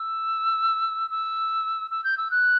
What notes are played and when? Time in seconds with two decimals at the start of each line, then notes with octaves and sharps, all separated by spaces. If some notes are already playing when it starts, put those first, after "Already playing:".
Already playing: E6
1.11 E6
1.91 E6
2.04 G6
2.18 E6
2.31 F#6